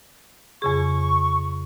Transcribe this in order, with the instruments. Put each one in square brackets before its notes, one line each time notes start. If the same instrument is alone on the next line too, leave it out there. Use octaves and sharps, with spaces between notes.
[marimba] F2 C#3 G#4 [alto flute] C#6